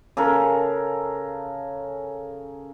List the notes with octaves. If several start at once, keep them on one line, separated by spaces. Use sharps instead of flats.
C#3 A4 A#4